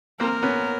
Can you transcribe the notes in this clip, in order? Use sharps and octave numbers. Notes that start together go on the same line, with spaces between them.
A#3 C4 A#4
B3 C#4